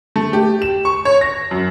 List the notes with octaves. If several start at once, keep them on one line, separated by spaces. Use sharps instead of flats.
A3
G4
E7
C#6
C#5
A#6
F#2